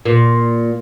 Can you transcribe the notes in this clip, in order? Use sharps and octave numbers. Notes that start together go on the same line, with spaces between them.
A#2